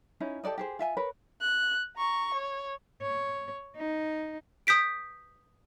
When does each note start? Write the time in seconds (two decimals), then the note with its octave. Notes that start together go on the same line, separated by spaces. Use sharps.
0.20 C#4 D#4 E4
0.44 G4 A4 D5 D#5
0.58 G4 G#4 C5
0.79 F4 E5 G#5
0.97 A#4 B4 C#5 B5
1.41 F#6
1.97 A#5 C#6
2.34 C#5
3.02 C#5
3.77 D#4
4.67 D#6 G6 B6 D7